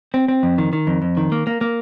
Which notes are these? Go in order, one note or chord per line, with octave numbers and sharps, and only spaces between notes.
C4
C4
F2
D#3
D#3
F2
F2
D#3
A#3
A#3
A#3